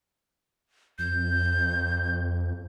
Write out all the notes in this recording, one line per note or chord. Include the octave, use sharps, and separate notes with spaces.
F2 G6